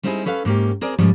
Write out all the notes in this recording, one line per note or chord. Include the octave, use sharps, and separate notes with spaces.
G3 C4 D#4 E4 F#4 G#4
C#4 A4 B4 F5
G#2 A#3 C#4 G4
C4 G#4 A#4 D5
G#2 F3 G3 C#4